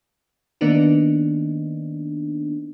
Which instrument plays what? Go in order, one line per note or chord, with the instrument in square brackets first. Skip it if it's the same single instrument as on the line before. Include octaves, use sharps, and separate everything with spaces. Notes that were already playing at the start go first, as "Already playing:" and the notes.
[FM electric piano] D#3 A#3 B3 D4 D#4